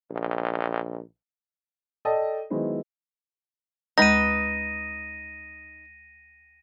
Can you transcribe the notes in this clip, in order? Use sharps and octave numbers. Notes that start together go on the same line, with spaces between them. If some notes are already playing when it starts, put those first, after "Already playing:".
A#1
A4 D5 D#5 G5 A5
D#3 F#3 G#3 B3 E4 C5
D2 G#3 D#4 B4 G6 A#6 D#7